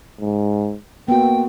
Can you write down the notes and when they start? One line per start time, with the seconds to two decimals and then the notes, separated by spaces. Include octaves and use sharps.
0.21 G#2
1.08 A#3 B3 F#4 G5